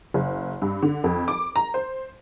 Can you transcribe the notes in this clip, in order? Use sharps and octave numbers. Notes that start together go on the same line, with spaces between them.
F#1
G2
D3
F2
D6
A#5
C5